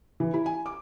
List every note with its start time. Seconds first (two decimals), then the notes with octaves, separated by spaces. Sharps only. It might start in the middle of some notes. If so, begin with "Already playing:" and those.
0.20 E3
0.34 E4
0.46 G#5
0.66 D6